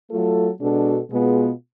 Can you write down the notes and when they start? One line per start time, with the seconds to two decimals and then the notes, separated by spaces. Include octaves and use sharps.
0.11 F#3 A3 F4 A4
0.60 B2 G#3 D4 F#4 A4
1.11 B2 G#3 B3 F4 G#4